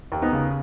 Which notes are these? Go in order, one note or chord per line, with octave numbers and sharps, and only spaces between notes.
D#2
B3 D#4
C#3